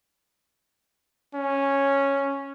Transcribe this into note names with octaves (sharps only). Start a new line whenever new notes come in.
C#4